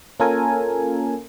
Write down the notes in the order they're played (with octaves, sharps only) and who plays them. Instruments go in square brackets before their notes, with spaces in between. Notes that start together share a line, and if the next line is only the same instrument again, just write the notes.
[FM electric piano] A#3 C#4 F4 A4 A#4 G#5